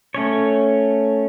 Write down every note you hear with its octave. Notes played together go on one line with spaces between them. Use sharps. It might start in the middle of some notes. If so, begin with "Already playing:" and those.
A3 C#4 C#5